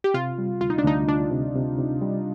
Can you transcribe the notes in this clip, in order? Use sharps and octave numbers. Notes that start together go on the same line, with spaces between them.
G4
C3 F4
G3
D2 F4
D#4
D4
D2 D#4
D2 D4
C3
C3
C3
G3